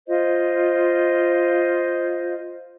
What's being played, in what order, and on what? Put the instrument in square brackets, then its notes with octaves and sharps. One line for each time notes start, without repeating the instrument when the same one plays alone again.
[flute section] F4 C5 D#5